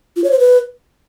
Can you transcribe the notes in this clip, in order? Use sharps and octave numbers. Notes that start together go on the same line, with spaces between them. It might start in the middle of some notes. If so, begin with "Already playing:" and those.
F4
C#5
C5
B4